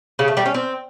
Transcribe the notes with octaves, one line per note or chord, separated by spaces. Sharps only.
C#3
A3
G3
C#4
C4